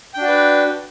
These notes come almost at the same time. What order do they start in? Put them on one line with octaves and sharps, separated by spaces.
G5 D4 F#4 D5 B4